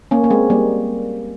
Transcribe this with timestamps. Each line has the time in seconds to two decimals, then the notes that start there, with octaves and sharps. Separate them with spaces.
0.11 A#3 C#4
0.24 A#3
0.30 G#3 C4
0.50 G3 A#3